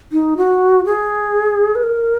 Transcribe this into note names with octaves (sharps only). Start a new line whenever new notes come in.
D#4
F#4
G#4
B4
A#4